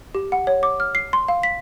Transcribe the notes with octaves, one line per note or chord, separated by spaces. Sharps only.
G4
F#5
C#5
D6
F6
C7
C6
F5
B6